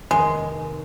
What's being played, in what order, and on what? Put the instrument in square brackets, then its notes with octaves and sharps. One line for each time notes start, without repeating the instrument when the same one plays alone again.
[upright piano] F1 D#2 D#3 A#3 D#4 [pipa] G#3